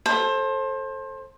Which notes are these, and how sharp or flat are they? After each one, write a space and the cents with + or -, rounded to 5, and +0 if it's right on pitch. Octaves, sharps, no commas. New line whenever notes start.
A4 +0 C5 +25